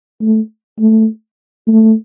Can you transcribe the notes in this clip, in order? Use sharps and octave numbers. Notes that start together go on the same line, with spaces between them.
A3
A3
A3